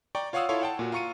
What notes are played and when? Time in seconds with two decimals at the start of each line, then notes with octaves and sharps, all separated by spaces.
0.15 D5 G5 A#5 C#6
0.33 F4 C#5 F5 F#5 D#6 E6
0.49 E4 F4 A4 C#5 F5 C6
0.61 F#5 G5 A5
0.79 A#2 F#4
0.92 F4 A#5 C#6 C#7 D#7